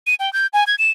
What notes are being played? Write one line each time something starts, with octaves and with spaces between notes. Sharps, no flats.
D#7
G5
G6
G#5
G#6
E7